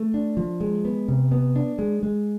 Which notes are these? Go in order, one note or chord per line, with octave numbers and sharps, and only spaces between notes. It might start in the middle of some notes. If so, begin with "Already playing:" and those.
Already playing: A3
D4
F3
G#3
B3
C3
B3
D4
G#3
G#3